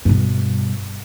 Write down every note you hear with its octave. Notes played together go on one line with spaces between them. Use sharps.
G2 B2